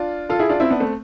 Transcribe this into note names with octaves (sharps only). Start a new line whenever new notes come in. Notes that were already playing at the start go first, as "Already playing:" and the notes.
Already playing: D4 F4
F4 A4
E4 G#4
D4 F4
C4 E4
B3 D4
A3 C4